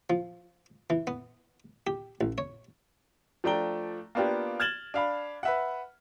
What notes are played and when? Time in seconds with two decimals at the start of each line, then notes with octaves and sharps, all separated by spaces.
0.10 F3
0.90 E3
1.07 B3
1.87 G4
2.21 A1
2.38 C#5
3.44 F3 A3 D4 G5 A#5 G7
4.15 A#3 B3 D4 F4 G4
4.60 F6 G#6 A6 E7 F#7 G7
4.94 D4 F5 B5
5.43 B4 E5 F#5